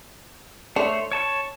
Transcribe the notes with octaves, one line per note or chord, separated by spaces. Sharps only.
A3 D4 C5 C#5
C#5 A5 C#6